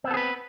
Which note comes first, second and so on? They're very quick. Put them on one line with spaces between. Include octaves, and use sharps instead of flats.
C4 B3 A4 G#4 B4